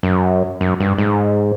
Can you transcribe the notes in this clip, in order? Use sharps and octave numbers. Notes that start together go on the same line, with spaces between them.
F#2
F#2
G2
G#2